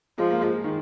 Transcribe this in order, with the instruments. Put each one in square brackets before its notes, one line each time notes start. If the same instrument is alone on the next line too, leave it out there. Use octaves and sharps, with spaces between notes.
[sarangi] F3 [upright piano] G#3
[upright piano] A#3
G#3
G#3
D#3